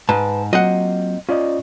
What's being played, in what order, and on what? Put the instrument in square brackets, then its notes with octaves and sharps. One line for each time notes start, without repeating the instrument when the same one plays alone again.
[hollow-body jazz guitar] G#2 [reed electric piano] B4 [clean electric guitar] A5
[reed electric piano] F#3 [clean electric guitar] A#3 C4 F4 [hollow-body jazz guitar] D#5 F#5
[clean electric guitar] C#4 [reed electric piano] F4 D5 D#5